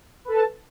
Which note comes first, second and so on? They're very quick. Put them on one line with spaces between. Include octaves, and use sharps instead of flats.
B4 A4 A5